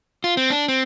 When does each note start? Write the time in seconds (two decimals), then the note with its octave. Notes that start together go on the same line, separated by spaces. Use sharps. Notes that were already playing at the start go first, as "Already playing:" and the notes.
0.24 F4
0.37 C4
0.50 D4
0.68 C4